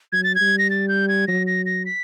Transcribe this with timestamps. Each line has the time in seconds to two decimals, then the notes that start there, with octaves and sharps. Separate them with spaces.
0.13 F#3 G#6
0.24 A6
0.35 G#6
0.41 G3
0.58 A#6
0.70 A6
0.88 G6
1.08 G#6
1.27 F#3 A#6
1.47 A#6
1.66 A#6
1.85 B6